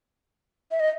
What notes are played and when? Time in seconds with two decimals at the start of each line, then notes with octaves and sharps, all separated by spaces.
0.71 E5
0.80 D#5